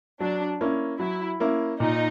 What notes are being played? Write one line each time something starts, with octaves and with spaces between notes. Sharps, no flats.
F#3 D4
A#3 C#4 E4
F#3 E4
A#3 C#4 E4
A#2 D#4